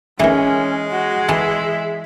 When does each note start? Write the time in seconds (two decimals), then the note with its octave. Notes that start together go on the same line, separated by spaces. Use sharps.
0.20 D#3 E3 G#3 A3 C#4
0.91 F#4
1.29 E3 A4 E5